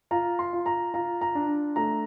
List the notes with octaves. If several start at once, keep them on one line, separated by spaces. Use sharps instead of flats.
F4 A#5
C6
F4
A#5
F4 A#5
A#5
D4
A3 A#5